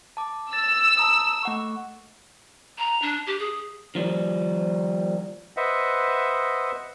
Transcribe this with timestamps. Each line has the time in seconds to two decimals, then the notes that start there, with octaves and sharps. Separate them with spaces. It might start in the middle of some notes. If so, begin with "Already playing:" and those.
0.17 A5 D6
0.53 E6 A6
0.97 A5 A#5 D#6
1.43 A3 F#5 C#6
2.78 A#5
3.02 D4
3.27 G4
3.39 G#4
3.95 D#3 F3 G3
5.57 B4 C5 D#5 E5 F#5